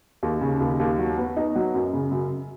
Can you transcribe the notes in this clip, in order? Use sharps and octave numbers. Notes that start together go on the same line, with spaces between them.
D#2
C#3
D#2
D#2
F#3
B3
D#4
F#3
F#2
C#3
F#2